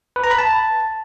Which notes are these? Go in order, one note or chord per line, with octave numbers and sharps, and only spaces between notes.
B4
A#5
B5
A5